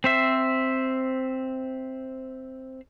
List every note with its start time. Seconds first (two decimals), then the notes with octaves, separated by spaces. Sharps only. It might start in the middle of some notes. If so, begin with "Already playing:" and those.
0.04 C4 C5 E5